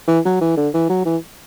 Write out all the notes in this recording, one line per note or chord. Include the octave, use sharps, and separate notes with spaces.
E3
F#3
E3
D3
E3
F#3
E3